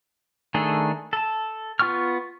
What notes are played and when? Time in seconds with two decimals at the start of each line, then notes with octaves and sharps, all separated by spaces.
0.54 D#3 A3 D4 G#4 A4
1.13 A4 A5
1.79 B3 F4 G5 C#6 F6